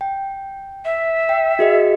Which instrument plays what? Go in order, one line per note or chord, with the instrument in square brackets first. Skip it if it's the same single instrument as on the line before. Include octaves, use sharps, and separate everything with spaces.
[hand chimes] G5
[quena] E5
[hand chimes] G5
F#4 G#4 D#5